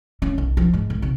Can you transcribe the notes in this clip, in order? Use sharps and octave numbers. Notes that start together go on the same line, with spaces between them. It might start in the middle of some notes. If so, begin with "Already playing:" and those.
C#4
B1
F3
G#2
B1
C3